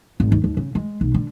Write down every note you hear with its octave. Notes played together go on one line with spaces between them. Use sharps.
G#1
D#2
D#2
C#3
G#3
B1
D3